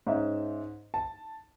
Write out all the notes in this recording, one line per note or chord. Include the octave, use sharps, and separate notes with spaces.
G#2 C#4 E5
A5